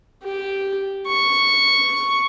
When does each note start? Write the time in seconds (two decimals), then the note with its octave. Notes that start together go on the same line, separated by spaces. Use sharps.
0.23 G4
1.07 C#6